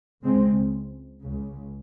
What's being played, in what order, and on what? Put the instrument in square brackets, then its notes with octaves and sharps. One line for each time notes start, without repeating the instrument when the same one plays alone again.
[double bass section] C#2 C#3 G#3 C4
C#2 C#3